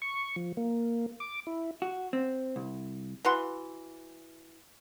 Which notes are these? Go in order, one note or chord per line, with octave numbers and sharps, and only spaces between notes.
C#6
F3
A#3
D6
E4
F#4
C4
C2
E3 F#4 F#5 C6